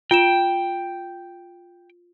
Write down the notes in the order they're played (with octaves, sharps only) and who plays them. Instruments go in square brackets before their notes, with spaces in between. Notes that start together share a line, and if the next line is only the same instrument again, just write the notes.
[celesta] F4 D7 E7 [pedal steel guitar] G5